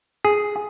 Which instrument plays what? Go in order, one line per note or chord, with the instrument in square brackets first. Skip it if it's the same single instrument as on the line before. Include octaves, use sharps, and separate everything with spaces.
[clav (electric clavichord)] G#4